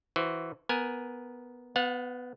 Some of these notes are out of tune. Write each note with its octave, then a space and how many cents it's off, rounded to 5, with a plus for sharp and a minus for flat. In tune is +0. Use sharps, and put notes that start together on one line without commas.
E3 +0 F#4 +0 C5 +0
B3 +0 A#4 +10 G#5 +0
B3 +15 F#5 -40